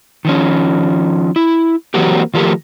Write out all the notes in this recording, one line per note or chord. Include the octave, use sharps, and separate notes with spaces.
D#3 F3 C#4
E4
E3 F#3 A#3 C4 F#4 G4
D#3 F3 A3 G4 A#4